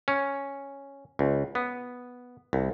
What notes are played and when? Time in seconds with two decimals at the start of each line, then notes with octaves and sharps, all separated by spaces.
0.08 C#4
1.19 C#2
1.55 B3
2.53 C2